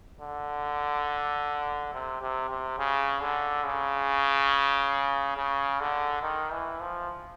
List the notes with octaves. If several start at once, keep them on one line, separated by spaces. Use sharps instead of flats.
D3
C3
C3
C3
C#3
D3
C#3
C#3
D3
D#3
E3
F3